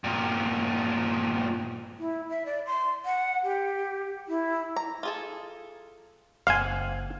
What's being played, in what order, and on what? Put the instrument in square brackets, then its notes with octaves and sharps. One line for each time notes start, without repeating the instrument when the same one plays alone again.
[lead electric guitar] G2 A#2
[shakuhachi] E4
E5
D5
C6
F#5
G4
E4
[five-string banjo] A#5
F4 G#4 A4
[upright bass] F#1 [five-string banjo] C4 F#5 [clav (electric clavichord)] F5 G#5